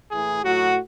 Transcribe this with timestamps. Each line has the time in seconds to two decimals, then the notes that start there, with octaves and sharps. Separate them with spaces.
0.10 A2 E3 G#4
0.43 A2 F#3 F#4